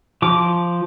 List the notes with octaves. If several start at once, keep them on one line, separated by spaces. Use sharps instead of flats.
F3 D6